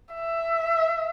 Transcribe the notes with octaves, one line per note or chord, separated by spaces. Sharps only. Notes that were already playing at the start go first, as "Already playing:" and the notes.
E5